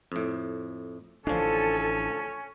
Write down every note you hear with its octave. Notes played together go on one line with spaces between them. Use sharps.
F2 A2
A1 D3 F3 C#4 D4 A4